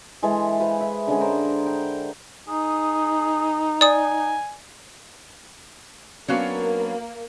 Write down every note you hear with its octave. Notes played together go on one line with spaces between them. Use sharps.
E3 G#3 A4 E5
G#4 B4 C5 F5
E5
D3 G#3 C#4 G#4
A#4 C5
G5
D#4 G#4
D5 G#5 D#6
F#3 A#3 B3 C#4 D4 F#4 F5